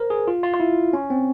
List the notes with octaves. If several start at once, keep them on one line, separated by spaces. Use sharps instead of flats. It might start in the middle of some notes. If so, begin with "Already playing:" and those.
Already playing: A#4 C5
G#4
F4
F4
F4
E4
C#4
C4